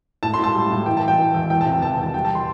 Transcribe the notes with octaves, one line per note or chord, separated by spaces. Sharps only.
A2 A5
C6
A2 A5
G3
A2
E3 G5
A5
E3
G5
E3
E2
E2 G5
A5
C3
G5
E2 A5
A5
E2
A5
G3 G5
A5
C6